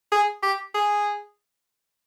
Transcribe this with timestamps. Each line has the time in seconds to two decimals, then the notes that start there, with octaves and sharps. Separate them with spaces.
0.12 G#4
0.43 G4
0.75 G#4